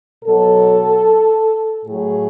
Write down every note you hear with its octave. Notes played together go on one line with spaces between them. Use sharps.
B2 F#3 A4
A2 F#3 G#4